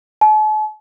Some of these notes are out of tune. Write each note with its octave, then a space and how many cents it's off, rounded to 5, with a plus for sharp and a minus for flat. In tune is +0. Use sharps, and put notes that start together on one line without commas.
A5 -45